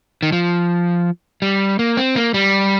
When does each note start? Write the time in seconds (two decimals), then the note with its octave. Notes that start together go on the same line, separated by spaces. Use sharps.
0.23 D#3
0.32 F3
1.42 G3
1.79 A#3
1.97 C4
2.16 A#3
2.34 G3